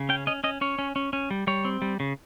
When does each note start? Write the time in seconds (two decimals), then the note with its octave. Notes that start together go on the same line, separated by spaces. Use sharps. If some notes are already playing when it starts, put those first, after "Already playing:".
Already playing: C#3
0.09 C#4 G5
0.27 C#4 D#5
0.44 C#4 D#5
0.61 C#4 C#5
0.79 C#4
0.96 C#4
1.13 C#4
1.31 G3
1.47 G3 C#5
1.65 C4
1.82 G3
2.00 C#3